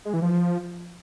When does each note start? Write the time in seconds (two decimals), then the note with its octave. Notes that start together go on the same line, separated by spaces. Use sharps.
0.05 G#3
0.14 E3
0.22 F3